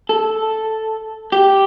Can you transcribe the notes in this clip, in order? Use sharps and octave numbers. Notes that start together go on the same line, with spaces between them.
A4
G4